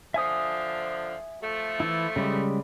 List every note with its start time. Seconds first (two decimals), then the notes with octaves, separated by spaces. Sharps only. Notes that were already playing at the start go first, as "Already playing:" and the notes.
0.14 D3 F3 E5 G#5 D#6
1.41 F3 A3
1.80 E3 E4
2.16 C#3 G3 G#3